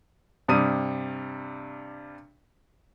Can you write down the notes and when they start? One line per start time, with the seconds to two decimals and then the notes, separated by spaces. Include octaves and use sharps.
0.48 G2 C3 G3 D#6 D#7